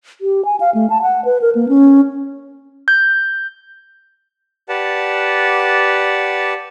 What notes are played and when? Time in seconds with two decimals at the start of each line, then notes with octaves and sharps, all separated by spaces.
0.21 G4
0.45 G#5
0.60 F5
0.75 A3
0.90 A5
1.02 F#5
1.25 B4
1.42 A#4
1.55 A#3
1.69 C#4
2.88 G6
4.69 G4 B4 D5 F#5 A5